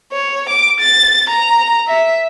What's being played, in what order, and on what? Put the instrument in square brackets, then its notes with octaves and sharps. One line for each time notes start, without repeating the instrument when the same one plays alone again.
[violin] C#5
D6
A6
A#5
E5